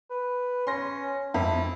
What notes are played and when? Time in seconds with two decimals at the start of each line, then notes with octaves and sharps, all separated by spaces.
0.10 B4
0.67 C#4 C6 A#6
1.34 F2 E4